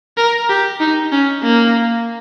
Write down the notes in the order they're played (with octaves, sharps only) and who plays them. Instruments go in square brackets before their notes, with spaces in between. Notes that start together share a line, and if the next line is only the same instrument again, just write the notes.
[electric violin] A#4
G4
D#4
C#4
A#3